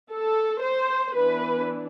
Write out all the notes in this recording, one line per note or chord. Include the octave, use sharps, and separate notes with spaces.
A4
C5
E3 B3 D4 B4